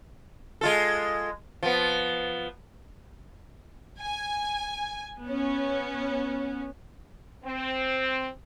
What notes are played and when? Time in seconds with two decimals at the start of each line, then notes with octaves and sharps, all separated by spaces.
0.61 G#3 F4 A4
1.63 F3 B3
4.01 G#5
5.22 B3 C#4
7.44 C4